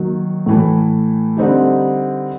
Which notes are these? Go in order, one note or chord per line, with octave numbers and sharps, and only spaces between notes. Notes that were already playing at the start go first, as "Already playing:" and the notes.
Already playing: D#3 F#3 A#3
A2 E3 A3
D3 G3 C4 D#4 G4